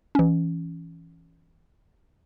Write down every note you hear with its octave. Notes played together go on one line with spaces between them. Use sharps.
E3 C#4